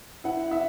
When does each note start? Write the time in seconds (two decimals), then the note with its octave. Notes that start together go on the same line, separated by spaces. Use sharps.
0.24 E4 F#5
0.51 E4 E5